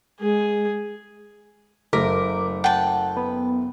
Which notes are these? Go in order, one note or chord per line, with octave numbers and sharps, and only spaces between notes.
G#3 G#4
F#1 A3 A#4 D6 B6
F#5 G5 A5
B3